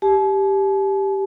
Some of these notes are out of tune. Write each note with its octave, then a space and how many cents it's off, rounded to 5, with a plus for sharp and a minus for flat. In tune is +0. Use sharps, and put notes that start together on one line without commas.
G4 +0 A5 -45